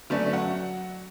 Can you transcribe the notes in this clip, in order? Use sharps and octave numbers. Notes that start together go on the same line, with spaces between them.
D3 F#3 A3 B3 C#4 D4
F#3 F#5